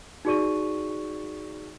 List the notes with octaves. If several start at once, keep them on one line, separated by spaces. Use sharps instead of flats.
D#4 F#4 G#4 D5 C#6 D#7